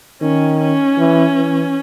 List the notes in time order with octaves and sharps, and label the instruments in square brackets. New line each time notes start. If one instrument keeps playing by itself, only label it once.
[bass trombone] D#3 [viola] C#4
[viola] C#4
[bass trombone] E3
E3